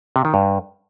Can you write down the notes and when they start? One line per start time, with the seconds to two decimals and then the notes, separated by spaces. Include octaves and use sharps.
0.16 C3
0.25 D#3
0.34 G2